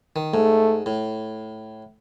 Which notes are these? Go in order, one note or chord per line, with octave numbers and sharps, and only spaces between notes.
D#3
G#2 A3
A2